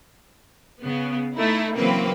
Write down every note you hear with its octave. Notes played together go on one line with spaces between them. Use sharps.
C#3 B3
A3 D#4 E4
C#3 E3 F#3 A#3 C4 B4